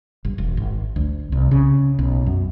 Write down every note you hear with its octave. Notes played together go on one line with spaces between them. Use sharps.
G1
E1
G#1
D2
C2
C#3
B1
F#2